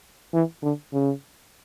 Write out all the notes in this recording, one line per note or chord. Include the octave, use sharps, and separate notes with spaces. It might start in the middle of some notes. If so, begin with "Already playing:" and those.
E3
D3
C#3